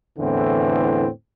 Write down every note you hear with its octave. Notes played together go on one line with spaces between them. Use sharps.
E2 A2 D3 E3 B3 C4